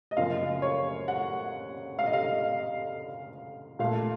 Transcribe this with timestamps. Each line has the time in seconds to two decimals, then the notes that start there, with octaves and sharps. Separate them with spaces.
0.11 D#5
0.17 F#2 C#3 F3 A#3 F5
0.62 C#5
1.08 F#5
1.99 F5
2.06 D#5
2.13 F5
3.79 A#2 A3 F5